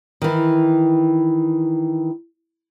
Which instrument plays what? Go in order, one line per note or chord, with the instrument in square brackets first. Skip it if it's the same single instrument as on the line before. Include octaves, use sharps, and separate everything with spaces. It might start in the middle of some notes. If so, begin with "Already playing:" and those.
[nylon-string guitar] D#3 E3